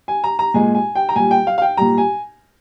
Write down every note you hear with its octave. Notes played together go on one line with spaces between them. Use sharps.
G#5
A#5
A#5
A#2 G#3 G#5
G#5
G5
A#5
A#2 G3 G#5
G5
F5
F5
G5
A#2 G3 A#5
G#5